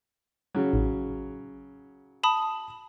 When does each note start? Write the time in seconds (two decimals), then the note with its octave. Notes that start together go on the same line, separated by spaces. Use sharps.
0.55 C#3 F#3
0.73 A1
2.23 A5 B5 D#6